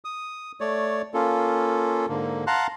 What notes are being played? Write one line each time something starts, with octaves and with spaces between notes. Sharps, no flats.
D#6
A3 C#5 D5
A#3 C#4 F4 A4
G#2 D3 A#3
F5 F#5 A5 A#5 C6 F#6